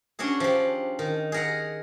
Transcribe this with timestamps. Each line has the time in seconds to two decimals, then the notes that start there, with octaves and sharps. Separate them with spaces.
0.19 C#4 D4 F#4 G#4
0.40 F3 G4
0.99 D#3
1.32 G#4 A#4 F#5